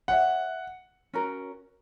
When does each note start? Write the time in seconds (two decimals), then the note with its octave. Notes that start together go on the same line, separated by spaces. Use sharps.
0.08 G#4 C#5 E5 F#5
1.13 C#4 F#4 A#4